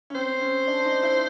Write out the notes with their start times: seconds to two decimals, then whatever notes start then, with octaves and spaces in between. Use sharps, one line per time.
0.10 C#4
0.15 C4 C5
0.41 C#4
0.67 D4
0.85 D#4
1.03 E4